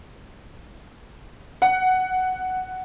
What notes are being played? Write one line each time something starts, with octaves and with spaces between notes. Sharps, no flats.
F#5